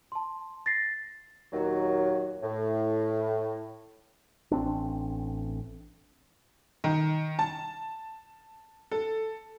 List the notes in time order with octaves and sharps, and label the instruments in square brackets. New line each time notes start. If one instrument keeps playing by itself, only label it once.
[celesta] A5 C6
A6 A#6 C7
[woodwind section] D#2 A#2 D#3 F#3
A2
[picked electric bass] A1 C4 D4
[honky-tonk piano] D#3
A5
A4